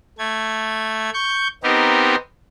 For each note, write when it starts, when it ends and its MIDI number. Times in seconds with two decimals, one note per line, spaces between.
0.19 1.10 57
0.19 1.10 92
1.14 1.48 85
1.14 1.48 91
1.63 2.16 59
1.63 2.16 60
1.63 2.16 63
1.63 2.16 67
1.63 2.16 70